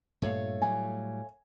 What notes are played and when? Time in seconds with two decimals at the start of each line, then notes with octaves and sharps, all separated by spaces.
0.22 G2 A#2 A3 C#5 F5
0.62 A2 F#3 G3 G#5